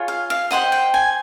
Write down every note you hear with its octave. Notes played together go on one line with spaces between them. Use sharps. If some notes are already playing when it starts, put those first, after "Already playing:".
Already playing: F4 G#4 C#5
F5
F5
G4 C5 D#5 F#5
G5
G#5